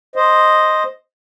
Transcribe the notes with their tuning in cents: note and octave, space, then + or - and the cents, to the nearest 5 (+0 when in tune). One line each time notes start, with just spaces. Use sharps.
C5 +0 D#5 +0